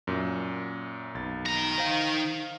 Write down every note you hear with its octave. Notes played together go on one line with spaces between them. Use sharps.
F#2 A#2
B1 A6
D#3 A#5
C5 F5